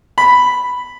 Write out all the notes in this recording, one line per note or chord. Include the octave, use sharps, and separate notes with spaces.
B5